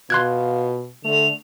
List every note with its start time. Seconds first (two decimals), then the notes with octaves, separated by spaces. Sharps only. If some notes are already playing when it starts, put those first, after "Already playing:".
0.10 B2 F4 C6 F#6 G#6
1.05 D3 A3 F7